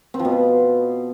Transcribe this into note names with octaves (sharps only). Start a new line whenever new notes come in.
C4
F3
B2